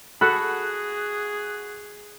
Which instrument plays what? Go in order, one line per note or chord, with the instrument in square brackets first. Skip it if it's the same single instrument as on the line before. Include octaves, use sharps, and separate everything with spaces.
[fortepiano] F#4 B5 [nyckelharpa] G#4 [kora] A4 F#5 [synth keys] F#6